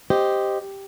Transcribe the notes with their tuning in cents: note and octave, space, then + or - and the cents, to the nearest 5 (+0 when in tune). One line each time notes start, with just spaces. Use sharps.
G4 +0 C5 +0 D#5 +0